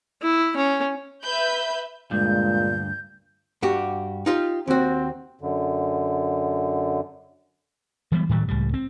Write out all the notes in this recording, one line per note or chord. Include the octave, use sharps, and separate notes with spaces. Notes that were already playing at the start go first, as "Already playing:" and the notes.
E4
C#4
B4 E5 B5 G6
D2 G2 A#2 G#3 G6
G2 F#4 G4
D#4 F4 G4
D#2 C4 F#4
F#2 D3
E3 F#3 G3 B3
A2 D#3 F#3 G3
C#2 A2 G3
C4